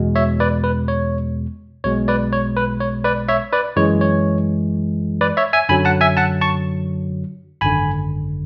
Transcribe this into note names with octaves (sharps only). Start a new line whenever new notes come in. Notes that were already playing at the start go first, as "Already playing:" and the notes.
Already playing: E2 B2 G#3
C#5 E5
B4 D5
B4
C#5
B1 B2 G#3 C#5
B4 D5
C#5
B4
C#5
B4 D5
C#5 E5
B4 D5
F#2 E3 G#3 C#5
C#5
B4 D5
C#5 E5
E5 G#5
F#2 D3 F#3 G#5 B5
F#5 A5
E5 G#5
F#5 A5
A5 C#6
G#1 F#2 D3 G#5 B5